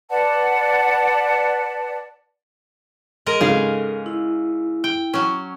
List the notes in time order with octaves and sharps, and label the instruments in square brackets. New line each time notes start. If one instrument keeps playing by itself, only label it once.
[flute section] B4 D5 F#5 A5
[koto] G#3 A#4 D#5
[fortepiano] G#2 C#3 [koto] G#4 F5 [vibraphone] A4
[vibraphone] E4
[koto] G5
F#3 C#4